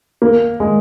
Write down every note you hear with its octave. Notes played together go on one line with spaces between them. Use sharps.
A#3
G#3